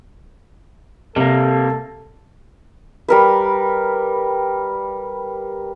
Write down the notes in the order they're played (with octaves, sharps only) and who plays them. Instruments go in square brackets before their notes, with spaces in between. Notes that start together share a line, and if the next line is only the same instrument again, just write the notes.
[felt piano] C3 [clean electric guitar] G3 A#3 [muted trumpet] A4
[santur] G3 A#4 B4